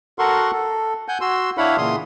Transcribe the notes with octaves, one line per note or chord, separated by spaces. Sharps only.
F#4 A4 A#4 F#5 C6 C#6
A4
F#5 G#5 G6
F#4 C6 E6
D4 E4 C#5 F5 F#5 B5
A#2 C#3 E3 C6 D#6